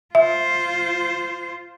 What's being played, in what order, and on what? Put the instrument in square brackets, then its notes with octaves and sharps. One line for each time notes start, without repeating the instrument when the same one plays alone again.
[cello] F4 C5 [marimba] E5